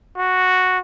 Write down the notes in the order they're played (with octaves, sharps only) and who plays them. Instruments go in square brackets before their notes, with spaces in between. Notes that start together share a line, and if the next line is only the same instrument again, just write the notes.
[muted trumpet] F#4